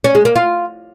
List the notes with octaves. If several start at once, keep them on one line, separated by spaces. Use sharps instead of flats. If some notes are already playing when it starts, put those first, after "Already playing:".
C#4
G#3
A#3
F4